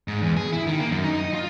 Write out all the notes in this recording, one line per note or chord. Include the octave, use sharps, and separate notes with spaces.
G#2
E2
G#4
E4
D#3
A#3
F#2
D#4
D#5
F4